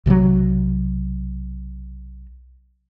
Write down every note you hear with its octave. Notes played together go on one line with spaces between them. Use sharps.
B1 C3 F3 F#3